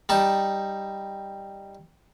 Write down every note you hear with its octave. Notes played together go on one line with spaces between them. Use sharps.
G3 D#4 A5